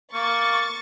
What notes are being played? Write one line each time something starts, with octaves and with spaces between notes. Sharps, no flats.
A#3 C#6 A6